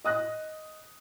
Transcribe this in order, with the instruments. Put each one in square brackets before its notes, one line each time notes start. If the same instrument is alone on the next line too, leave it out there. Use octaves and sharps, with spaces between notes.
[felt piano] D#5 D#6 F#6 A#6